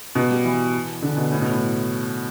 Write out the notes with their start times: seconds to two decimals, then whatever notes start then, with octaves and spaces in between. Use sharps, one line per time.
0.15 B2
0.30 G3
0.45 E3
1.02 D3
1.17 B2
1.32 A2
1.41 B2
1.51 A2